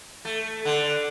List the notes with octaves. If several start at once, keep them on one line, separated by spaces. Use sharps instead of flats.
A3
D3